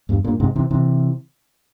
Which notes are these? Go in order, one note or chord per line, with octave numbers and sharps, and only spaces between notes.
E2 G2
G2 A#2
G#2 C3
C3 E3
C3 E3